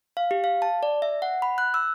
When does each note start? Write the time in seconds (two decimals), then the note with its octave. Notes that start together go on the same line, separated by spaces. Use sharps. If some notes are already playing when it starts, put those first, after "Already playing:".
0.17 F5
0.31 G4
0.44 F5
0.62 A5
0.83 D5
1.02 E5
1.22 F#5
1.42 B5
1.58 F#6
1.74 E6